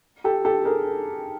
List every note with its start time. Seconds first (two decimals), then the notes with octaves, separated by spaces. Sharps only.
0.24 G4 A4
0.45 G4 A4
0.65 G#4 A#4